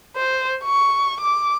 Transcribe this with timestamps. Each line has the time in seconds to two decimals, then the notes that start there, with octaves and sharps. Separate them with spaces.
0.17 C5
0.64 C#6
1.20 D6